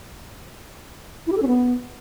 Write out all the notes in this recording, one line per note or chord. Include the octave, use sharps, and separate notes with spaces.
E4
G4
A4
C#4
B3